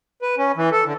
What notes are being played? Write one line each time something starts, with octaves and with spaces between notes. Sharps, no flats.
B4
C#4
E3
A4
D3